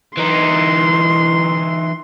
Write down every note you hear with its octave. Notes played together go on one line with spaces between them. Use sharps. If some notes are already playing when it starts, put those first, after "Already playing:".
E3 D#4 C6